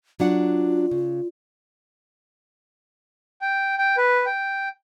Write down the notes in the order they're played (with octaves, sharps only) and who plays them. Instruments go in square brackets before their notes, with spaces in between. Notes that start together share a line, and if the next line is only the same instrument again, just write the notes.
[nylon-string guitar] F#3 D4 F#5 [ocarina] F4
[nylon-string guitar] C#3
[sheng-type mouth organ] G5
G5
B4
G5